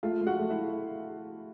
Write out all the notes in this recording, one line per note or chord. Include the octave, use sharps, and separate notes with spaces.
A3 F4 F5
A3
F#4 F#5
A3
E4 E5